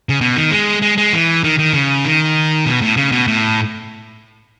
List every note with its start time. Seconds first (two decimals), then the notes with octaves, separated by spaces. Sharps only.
0.09 C#3
0.21 B2
0.36 D#3
0.51 G#3
0.82 G#3
0.97 G#3
1.13 E3
1.44 D#3
1.59 D#3
1.74 C#3
2.05 D#3
2.66 B2
2.81 A2
2.97 C#3
3.12 B2
3.27 A2